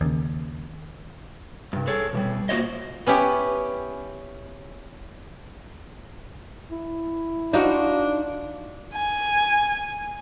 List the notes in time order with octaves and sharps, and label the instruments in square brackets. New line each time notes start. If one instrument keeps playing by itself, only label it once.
[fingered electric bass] D#2 C#3
[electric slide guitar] G2 C3
G#4 A4 C#5
B2 E3 G3
A#3 F4 F#4 C5 C#5 D#5
[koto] B3 C#4 E4 G4
[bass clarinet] E4
[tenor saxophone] D4 [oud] D#4 F4 F#4
[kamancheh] G#5